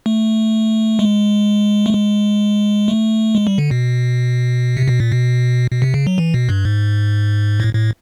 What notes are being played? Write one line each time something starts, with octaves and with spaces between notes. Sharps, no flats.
A3
G#3
A3
G#3
A3
G#3
G3
D3
B2
C3
B2
A#2
B2
B2
C3
C#3
F#3
E3
B2
G2
G#2
A2
A2